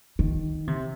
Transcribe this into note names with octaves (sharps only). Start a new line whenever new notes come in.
D#3
C3